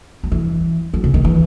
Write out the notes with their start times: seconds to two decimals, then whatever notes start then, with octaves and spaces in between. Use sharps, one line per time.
0.23 F#3
0.32 E3
0.94 F#3
1.04 C#3
1.14 D#3
1.25 E3